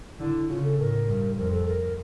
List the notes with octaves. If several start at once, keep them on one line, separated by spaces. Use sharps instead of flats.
D3 E4
C#3 F4
A4
A2 A#4
G2
F2 A#4
A4
A#4